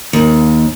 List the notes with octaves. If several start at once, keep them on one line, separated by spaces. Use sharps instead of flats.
D#2